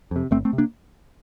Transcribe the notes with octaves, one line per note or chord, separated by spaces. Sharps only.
F2 C3
G1 A3 C4
A3 C4
C3
A#3 D4